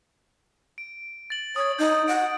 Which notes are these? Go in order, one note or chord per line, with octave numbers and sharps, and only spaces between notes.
D7
A6 F#7
C#5 D#6 G#6
D#4 G6
F#5 D7